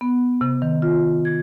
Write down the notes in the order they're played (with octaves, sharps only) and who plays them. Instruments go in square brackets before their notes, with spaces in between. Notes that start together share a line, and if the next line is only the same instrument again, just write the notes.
[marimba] B3
C3
D#3
F4
G#6